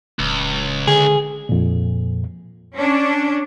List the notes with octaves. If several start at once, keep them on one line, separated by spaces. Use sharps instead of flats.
D1 C#2
D3 G#4
F2 A#2
C#4 D4